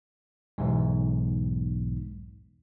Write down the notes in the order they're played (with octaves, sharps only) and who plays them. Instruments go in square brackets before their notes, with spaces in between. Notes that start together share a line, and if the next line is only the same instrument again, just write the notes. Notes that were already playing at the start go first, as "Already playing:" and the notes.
[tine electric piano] B1 E2 G#2